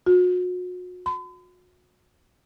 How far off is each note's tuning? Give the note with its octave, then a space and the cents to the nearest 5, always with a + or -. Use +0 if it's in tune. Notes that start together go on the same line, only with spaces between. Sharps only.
F#4 -40
B5 +45